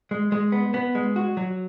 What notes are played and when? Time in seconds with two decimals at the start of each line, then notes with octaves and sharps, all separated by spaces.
0.11 G#3
0.32 G#3
0.52 B3
0.74 B3
0.95 G#3
1.16 F#4
1.37 F#3